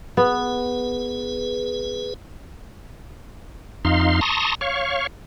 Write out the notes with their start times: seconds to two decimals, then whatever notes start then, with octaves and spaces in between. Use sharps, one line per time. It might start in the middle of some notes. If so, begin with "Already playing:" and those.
0.17 B3 G#4 B4
3.85 F2 D#4 F5 C6
4.21 A5 A#5 C6 C#6 D#6
4.61 C#5 F5 C#6